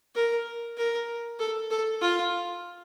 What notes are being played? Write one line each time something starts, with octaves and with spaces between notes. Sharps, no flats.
A#4
A#4
A4
A4
F4